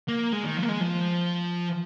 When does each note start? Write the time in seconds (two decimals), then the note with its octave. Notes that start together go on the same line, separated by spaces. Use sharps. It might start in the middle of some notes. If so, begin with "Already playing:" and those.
0.08 A#3
0.33 G#3
0.44 D#3
0.57 F3
0.62 A#3
0.69 G#3
0.81 F3